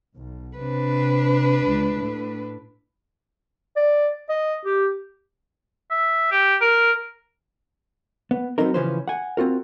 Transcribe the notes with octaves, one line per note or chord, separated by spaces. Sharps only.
B1
C3 D4 B4
C#2
A2
D5
D#5
G4
E5
G4
A#4
B3
F#3 G3 B3 C4 D#4 A#4
C#3 E3 F3 C#4 B4 C5
F#5 G#5
C4 F4 F#4 A#4